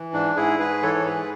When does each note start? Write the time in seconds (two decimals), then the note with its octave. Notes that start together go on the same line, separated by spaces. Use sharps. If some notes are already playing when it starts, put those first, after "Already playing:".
Already playing: E3
0.13 G#2 D4
0.36 G#2 E4 G#4
0.59 G#2 G#4 B4
0.82 E3 A4 C#5
0.94 C#5
1.06 G#2 G#4 B4